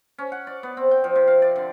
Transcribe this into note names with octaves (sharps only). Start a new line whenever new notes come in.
C#4
F#5
D5
B3
C4
G5
F3
C3
F5
D5
D3